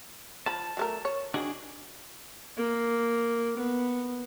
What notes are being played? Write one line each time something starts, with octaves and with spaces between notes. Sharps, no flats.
F3 A5 B5
F#3 A3 A#4
C#5
D#3 D4 F#4 G#4
A#3
B3